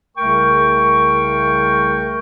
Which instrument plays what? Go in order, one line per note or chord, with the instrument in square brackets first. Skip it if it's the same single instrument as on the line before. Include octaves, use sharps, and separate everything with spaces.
[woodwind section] C2 C#3 A3 A#4 G5 C#6